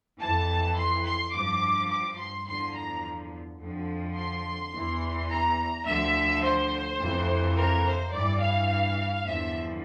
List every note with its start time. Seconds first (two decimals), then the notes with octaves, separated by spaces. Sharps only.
0.19 F2 E3 A5
0.77 C6
1.05 C6
1.33 G2 F3 D6
1.90 D6
2.18 C6
2.47 E2 D3 F3 C6
2.76 A#5
3.60 F2 D3 F3
4.17 C6
4.73 E2 E3
5.30 A#5
5.87 D2 D3 F3 E5
6.44 C5
7.00 F2 C3 E3
7.57 A#4
7.85 C5
8.13 G2 E3 D5
8.42 F5
9.27 E2 D3 F3 E5